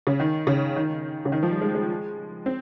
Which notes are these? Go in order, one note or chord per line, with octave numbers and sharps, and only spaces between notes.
C#3
D#3
C#3
D#3
C#3
D#3
F3
G3
G#3
G#3
C4